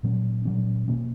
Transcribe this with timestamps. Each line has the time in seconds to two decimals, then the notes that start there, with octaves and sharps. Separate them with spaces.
0.03 A#2 F#3 C#4
0.45 A#2 F#3 C#4
0.88 B2 A#3 C#4